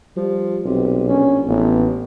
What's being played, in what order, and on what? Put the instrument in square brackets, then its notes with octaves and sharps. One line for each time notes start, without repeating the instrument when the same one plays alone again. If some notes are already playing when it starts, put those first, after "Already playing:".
[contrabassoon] F3 [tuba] G3
[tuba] B1 [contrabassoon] C3
[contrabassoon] A#1 [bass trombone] C#4
[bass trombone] A1 [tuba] B3